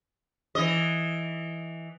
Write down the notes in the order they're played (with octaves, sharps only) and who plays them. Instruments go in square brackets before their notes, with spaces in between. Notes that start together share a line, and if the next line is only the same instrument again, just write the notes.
[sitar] E3 D#5